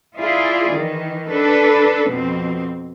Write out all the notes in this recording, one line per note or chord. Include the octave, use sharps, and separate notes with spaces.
E4 F4 G#4 D5
D#3 E3
D4 A4 B4
F2 B2 C4